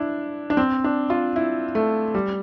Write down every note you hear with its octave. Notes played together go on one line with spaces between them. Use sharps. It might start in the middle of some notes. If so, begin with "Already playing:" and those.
Already playing: D4 E4
D4
C4
D4
F4
E4
A3
G3